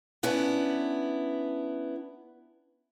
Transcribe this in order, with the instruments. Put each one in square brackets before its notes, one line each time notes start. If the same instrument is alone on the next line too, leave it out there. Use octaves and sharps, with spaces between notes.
[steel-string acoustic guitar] B3 C#4 D4 E4 B4